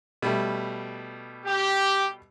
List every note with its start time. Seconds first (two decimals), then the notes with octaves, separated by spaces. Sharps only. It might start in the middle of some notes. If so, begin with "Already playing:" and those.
0.22 B2 G3 A3
1.46 G4